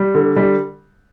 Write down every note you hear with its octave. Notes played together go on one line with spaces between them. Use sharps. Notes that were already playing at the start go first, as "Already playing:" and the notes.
Already playing: G3
D3
G3